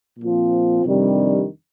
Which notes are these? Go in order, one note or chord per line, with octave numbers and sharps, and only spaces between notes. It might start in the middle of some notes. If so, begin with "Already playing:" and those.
A#2 F3 C4 F4
F2 C3 D#3 G3 D4